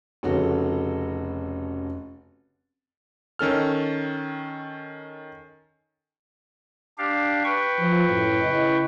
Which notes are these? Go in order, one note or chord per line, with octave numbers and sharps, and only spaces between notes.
F1 C#3 C#4 F#4 A4
D#3 C#4 A4 F6
D4 G4 F5
B4 G5 C#6
F3
F#2 A2
C#3 E4 D#5